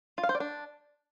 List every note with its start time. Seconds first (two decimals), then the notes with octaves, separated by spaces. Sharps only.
0.18 F4
0.23 F5
0.29 C5
0.35 D5
0.40 D4